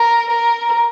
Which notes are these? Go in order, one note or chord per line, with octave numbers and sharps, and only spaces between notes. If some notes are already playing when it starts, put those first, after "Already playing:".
Already playing: A#4
A#4